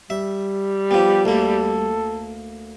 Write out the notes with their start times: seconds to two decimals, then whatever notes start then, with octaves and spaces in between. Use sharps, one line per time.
0.10 G3 E5
0.91 F3 B3 G4
1.25 D2 A#3 A4